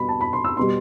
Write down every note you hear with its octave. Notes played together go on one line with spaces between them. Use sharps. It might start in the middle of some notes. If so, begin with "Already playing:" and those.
Already playing: B2 G3 B5
A5
B5
C6
E6
B2 G3 C6